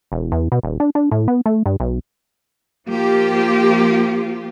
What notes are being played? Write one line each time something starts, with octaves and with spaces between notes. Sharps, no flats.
E1
E2
B2
D#1
D4
D4
A2
B3
A3
G2
B1
F3 A#3 F4 G4